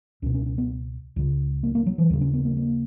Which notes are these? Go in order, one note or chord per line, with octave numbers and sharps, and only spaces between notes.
C#2 B2 C#4
C#4
C#4
B3
C#2 C#3
A#3
A#3
F#3
E3
D#2 C#3 F#3
C#4
B3
A#3
A#3